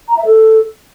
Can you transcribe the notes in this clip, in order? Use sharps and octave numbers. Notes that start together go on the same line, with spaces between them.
A#5
E5
A4